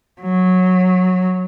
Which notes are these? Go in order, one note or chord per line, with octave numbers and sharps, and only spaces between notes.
F#3